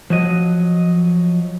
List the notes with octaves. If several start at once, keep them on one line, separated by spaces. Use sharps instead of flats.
F3 F#3 D#5